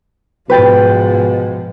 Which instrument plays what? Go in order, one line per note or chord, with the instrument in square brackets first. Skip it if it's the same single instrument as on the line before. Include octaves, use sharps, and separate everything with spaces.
[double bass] G#2 F3 [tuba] B2 [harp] B4 G5 A6